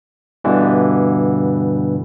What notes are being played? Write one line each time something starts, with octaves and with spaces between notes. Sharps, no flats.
G2 B2 D3 E3